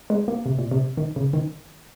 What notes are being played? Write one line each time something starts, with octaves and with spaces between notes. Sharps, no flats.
G#3
A#3
C3
A#2
C3
D#3
C#3
D#3